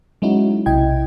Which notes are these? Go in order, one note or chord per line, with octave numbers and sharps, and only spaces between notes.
F#3 G#3 C#4 D#4 E4 F#4
B1 C3 E4 D#5 G5 G#6